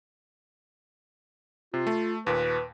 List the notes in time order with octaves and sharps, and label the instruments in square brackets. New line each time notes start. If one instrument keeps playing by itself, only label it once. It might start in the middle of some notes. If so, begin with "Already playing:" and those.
[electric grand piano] C3 [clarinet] F4
[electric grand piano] A3
[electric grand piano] D#2 A#2 [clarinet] B4